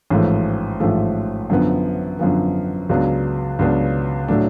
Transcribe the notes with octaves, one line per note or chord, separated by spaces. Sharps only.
A1 G#2 F3 A3
A1 G#2 F3 A3
F#2 D3 F3 B3
F#2 D3 F3 B3
C#2 C#3 F#3 B3 D4
C#2 C#3 F#3 B3 D4
A2 F#3 A3 D4